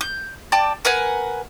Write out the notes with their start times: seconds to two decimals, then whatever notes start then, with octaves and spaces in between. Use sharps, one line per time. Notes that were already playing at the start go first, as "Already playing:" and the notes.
0.01 G6
0.52 D5 G5 A5
0.85 A#4 B4 F#5 G#5